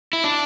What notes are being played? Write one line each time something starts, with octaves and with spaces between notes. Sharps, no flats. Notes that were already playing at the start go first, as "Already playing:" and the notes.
E4
D4